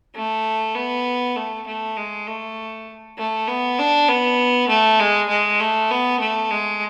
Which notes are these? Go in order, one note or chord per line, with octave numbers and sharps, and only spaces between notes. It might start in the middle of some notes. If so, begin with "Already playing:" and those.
A3
B3
A3
A3
G#3
A3
A3
B3
D4
B3
A3
G#3
G#3
A3
B3
A3
G#3